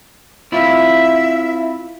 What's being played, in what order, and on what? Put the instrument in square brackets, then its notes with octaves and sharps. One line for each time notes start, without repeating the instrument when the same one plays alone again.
[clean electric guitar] C4 E4 F4 [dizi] E5